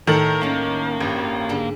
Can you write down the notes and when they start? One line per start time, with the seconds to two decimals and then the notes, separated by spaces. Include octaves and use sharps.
0.07 A2 D#3 A4 A#4 F#7
0.41 A#3 C#4 A#5
1.00 G#1 G2
1.49 G#2 D3 D4